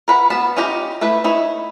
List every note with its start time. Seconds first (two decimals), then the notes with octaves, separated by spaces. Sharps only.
0.08 A#4 B4 F#5
0.30 B3 F#4 F5 A5 B5
0.57 C#4 D#4 F4 G4 A#5
1.01 A3 E4 B4
1.24 D#4 E4 C#5